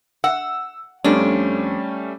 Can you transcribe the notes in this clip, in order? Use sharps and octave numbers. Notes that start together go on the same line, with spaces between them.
F#5 E6
F2 G3 A3 C#4 D4